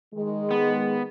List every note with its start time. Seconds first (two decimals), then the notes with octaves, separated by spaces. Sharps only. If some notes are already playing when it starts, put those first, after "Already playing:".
0.15 D#3 G#3
0.51 B3